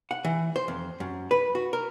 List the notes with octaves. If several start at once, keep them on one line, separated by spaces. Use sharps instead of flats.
F#5
E3
C5
F2
F#2
B4
F#4
A#4